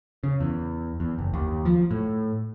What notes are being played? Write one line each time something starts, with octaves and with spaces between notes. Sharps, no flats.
C#3
E2
E2
F#1
D#2
F3
A2